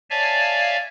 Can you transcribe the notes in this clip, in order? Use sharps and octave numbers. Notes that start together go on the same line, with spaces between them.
C#5 D5 E5 F5 G#5 A5